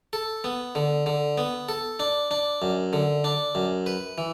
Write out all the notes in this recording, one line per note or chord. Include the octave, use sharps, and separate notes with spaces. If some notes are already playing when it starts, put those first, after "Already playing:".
A4
B3
D3
D3
B3
A4
D4
D4
F#2
D3
D4
F#2
B4
E3